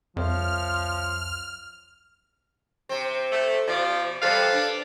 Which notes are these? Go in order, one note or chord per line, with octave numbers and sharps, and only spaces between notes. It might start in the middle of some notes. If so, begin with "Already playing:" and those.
C2 F2 F3 C#5 E5 F6
C3 C4
A3
B2 F3 D5
C3 F3 G3 A4 B4 F5
D4